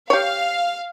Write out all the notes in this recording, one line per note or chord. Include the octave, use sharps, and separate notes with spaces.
G4 C#5 F5